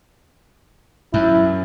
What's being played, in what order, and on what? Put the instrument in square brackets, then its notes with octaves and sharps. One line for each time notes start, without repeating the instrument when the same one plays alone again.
[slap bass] F#2 [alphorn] E4